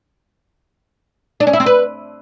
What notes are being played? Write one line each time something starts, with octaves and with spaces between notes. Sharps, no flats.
D4
C#4
E4
C4
B4